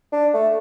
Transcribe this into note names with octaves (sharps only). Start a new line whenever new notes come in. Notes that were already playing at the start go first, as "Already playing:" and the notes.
D4
A3